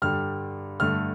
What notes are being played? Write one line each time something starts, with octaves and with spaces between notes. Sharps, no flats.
G2 D3 G3 F6
G2 D3 A3 F6